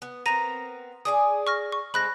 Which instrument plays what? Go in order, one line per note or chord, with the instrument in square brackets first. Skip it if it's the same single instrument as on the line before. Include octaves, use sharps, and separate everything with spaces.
[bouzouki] B3
[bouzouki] B3 C4 A#4 [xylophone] A#5 A#6 D#7
[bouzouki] G#4 D5 G#5 [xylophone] D#6
[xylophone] C#6 F6 A#6
C#6
[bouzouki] G#3 A3 C4 [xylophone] B5 F#6 A#6